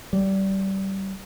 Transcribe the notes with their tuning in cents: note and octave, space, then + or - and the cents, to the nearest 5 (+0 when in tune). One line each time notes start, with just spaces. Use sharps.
G3 -20